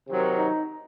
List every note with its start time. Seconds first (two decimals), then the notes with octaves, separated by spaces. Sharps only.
0.08 C3 D#3 F#3 C4
0.38 D#4